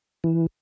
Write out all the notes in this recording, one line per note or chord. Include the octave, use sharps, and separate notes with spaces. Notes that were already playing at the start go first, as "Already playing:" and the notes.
E3